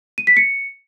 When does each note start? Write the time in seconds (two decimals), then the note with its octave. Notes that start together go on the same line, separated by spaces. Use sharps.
0.18 D#7
0.27 B6
0.37 C#7